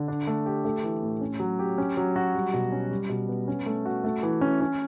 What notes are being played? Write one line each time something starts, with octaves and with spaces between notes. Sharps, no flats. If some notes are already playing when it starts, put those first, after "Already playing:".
Already playing: D3
D4
A3
G4
A3
E3
A2
C#4
F#3
G4
C#4
F#3
F#4
G3
B2
C#4
G3
B2
B3
C#4
A3
F#4
A3
E3
C#4
C#4